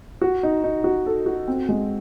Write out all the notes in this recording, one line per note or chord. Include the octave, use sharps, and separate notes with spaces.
F#4
D#4
D#4
F#4
A4
F#4
C4
G#3